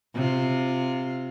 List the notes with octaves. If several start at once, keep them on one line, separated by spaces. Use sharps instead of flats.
C3 F4